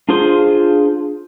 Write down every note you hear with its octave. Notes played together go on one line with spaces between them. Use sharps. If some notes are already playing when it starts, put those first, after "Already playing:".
D4 F4 G#4 C5 C6